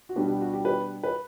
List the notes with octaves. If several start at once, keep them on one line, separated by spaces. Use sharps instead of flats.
F#4
B2 G3 B3 D4 G4
G4
F#4
G4
G4 B4
B4